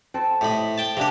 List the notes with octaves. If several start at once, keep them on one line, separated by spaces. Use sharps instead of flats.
C4 A4
A2 G4 D#5 B5
G5 A5
C3 A#3 D4 G4